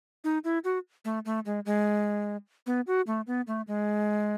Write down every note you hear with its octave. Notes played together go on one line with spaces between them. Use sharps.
D#4
E4
F#4
A3
A3
G#3
G#3
B3
F#4
A3
B3
A3
G#3